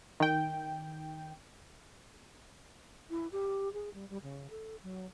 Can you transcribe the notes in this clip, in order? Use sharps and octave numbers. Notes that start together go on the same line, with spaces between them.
D#3 G5
E4
G4
G#4
G3
G3
C#3
A4
F#3